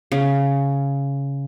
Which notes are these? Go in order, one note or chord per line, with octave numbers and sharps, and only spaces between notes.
C#3